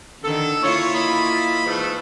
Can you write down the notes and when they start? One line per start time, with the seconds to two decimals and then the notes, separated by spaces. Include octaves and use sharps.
0.23 D3 D#3 A4
0.63 A#3 E4 F4 C#5
0.94 D#5 B5
1.66 G#2 E3 A3